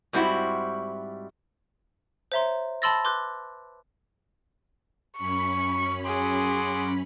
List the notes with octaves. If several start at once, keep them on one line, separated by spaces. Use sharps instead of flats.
G#2 G3 C4 E4 F#4
C5 C#5 E5 A#5 C6
A5 B5 C6 E6 A6 A#6
B4 C6 D6 F#6 G6
F#2 C#4 B5 C#6
F#4 G#4 C6 D6